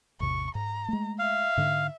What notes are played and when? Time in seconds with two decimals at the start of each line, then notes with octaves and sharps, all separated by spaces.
0.20 A1 E2 C3 C#6
0.55 G#2 A#5
0.88 G#3 A3
1.19 E5 F5
1.57 G#2 D3